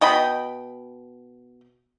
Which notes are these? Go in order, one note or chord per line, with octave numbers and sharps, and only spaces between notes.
B2 D#5 G5 B5